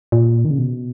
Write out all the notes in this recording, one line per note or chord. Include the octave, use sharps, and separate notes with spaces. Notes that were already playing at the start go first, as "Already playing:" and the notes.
A#2
D#3
C#3
B2